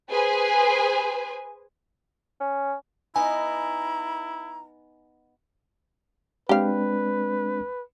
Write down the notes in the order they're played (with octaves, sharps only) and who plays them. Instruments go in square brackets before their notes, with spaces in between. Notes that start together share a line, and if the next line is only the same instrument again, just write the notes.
[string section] G#4 B4 C5 G#5
[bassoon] C#4
[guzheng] B3 D#4 [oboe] E4 [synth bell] G#5 [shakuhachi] A#5
[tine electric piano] G#3 C4 D4 [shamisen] G4 F5 [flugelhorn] B4